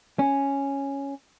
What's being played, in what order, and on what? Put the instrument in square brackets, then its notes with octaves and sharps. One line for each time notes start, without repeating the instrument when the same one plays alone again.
[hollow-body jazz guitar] C#4